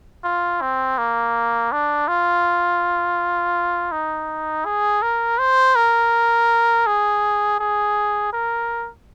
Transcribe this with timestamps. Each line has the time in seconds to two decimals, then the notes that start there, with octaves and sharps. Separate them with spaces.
0.24 F4
0.61 C4
0.98 A#3
1.72 D4
2.08 F4
3.92 D#4
4.65 G#4
5.02 A#4
5.39 C5
5.75 A#4
6.86 G#4
7.60 G#4
8.33 A#4